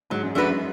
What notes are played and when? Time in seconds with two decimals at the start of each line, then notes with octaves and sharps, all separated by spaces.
0.10 G#2 F#3
0.23 F#2
0.35 F#2 A3 D4 F#4 B4
0.47 F#2